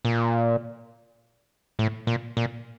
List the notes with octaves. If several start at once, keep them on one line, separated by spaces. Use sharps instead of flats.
A#2
A2
A#2
A#2